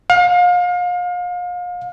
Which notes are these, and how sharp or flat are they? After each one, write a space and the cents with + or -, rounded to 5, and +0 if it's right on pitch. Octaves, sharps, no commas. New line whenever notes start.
F5 +35